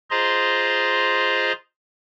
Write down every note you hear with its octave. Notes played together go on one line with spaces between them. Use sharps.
F4 G#4 C5 D#5 A#5 C6